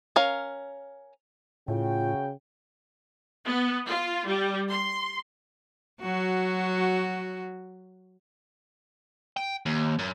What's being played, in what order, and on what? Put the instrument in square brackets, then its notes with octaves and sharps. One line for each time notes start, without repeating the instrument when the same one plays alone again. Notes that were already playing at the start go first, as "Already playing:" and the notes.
[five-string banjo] C#4 A#4 F5
[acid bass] A2 [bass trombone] C#3 [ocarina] F4 [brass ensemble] F#4 G5
[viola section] B3
F4
G3
C6
[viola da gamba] F#3 F#4
[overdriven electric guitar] G5
D#2
F#2